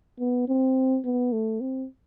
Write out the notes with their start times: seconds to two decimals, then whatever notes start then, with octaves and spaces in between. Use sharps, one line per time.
0.20 B3
0.48 C4
1.05 B3
1.33 A3
1.61 C4